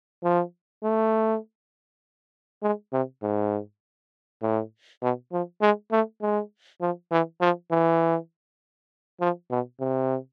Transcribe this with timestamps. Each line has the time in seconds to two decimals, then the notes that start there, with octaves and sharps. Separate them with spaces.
0.23 F3
0.83 A3
2.62 G#3
2.93 C3
3.23 G#2
4.42 A2
5.02 B2
5.32 F3
5.62 G#3
5.92 A3
6.22 G#3
6.81 F3
7.12 E3
7.41 F3
7.71 E3
9.21 F3
9.51 B2
9.80 C3